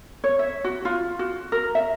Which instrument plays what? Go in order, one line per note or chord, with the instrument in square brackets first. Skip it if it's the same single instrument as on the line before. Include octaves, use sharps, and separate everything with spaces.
[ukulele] C#5
E5
F#4
F4
F#4
A#4
E5